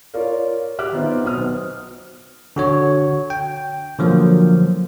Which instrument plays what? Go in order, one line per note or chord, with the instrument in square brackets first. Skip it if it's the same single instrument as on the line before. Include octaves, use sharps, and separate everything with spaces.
[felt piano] F4 A#4 C#5 D5 F5
G4 E5 D6 F6 F#6
D#3 B3 C4 D#4 F4 C5
B1 B2 B3 C5 D#6 F6
[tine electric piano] D3 F#4 C#5
G5
D3 F3 F#3 A#3